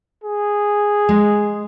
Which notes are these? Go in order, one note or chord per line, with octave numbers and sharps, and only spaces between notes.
G#4
G#3